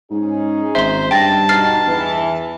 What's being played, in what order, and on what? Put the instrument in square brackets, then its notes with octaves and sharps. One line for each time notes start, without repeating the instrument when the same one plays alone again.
[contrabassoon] G#2 [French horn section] C#4 D#4 G#4
[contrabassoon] G#1 [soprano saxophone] C5 [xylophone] E5 C6
[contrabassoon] G2 [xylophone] G5 A6 A#6 [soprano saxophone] A5
[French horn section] B2 D#4 [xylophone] F6 A6 C7
[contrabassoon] E2 [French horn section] E3